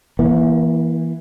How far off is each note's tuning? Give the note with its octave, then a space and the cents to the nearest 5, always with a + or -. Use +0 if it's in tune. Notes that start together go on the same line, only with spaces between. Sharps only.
E3 +0 A#3 +35